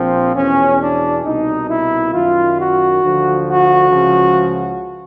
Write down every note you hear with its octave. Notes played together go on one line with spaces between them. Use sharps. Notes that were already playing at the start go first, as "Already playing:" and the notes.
Already playing: A#1 A#2 F3 C4
E2 B2 C#4
D4
C2 B2 D#4
E4
F#2 D#3 F4
F#4
D2 D3 F3
F#4
C#2 C#3 F3